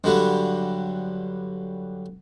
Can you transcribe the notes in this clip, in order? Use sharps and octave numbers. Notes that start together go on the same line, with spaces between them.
G2 D3 F#3 G3